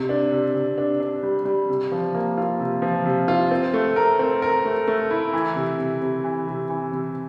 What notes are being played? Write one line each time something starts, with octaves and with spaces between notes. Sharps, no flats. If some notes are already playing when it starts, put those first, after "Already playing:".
Already playing: C3
D4
C3
C3
D4
D4
G3
G3
C3
F3
A#3
F4
C3
F3
C3
F4
C4
A3
A#4
C4
A#4
A3
A3
E4
E3
C3
C3
C3
E3
C3
E3
C3